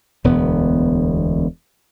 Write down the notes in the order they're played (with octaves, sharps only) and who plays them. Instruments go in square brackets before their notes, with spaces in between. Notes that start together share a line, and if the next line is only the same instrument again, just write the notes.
[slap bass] E1 D2 B3